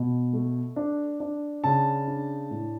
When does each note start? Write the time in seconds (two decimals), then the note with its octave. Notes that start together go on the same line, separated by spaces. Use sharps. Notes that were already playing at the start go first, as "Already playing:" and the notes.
Already playing: B2
0.33 A3
0.76 D4
1.20 D4
1.64 C#3 A5
2.07 D4
2.51 A2